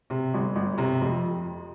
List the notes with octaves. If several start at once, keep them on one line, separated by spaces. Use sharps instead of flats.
C3
G1
G1
C3 A#5
F2